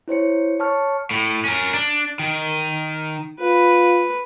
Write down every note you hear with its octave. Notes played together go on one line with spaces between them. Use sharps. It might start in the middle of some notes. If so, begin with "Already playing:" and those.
E4 C5 C#5 C#7
C#5 A5 C#6 F6 C#7
A2
C#4 A#4
D4
D#3
F4 B4